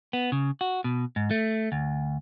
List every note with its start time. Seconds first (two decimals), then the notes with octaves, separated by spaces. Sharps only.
0.13 B3
0.32 C#3
0.61 F#4
0.84 B2
1.16 G#2
1.31 A3
1.72 D2